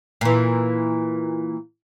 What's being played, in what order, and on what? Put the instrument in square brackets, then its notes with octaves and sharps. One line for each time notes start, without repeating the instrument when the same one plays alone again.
[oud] A#2 E3